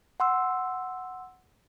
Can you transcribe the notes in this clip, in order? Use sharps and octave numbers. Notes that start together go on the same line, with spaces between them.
F#5 C6 E6